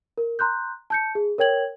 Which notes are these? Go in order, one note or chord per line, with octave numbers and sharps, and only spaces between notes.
A#4
A#5 C6 F#6 G6
A5 G6 C#7
G#4
A#4 C#5 G5 G#6 F#7